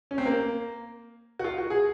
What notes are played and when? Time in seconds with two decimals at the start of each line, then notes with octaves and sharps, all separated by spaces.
0.11 C#4
0.18 C4
0.26 A#3
1.39 F#4
1.44 F4
1.58 F#4
1.70 G#4